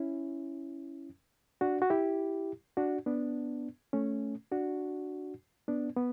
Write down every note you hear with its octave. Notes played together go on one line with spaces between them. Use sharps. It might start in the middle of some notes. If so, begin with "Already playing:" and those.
Already playing: C#4 E4
D4 F#4
F#4
E4 G4
D4 F#4
B3 D4
A3 C#4
D4 F#4
B3 D4
B3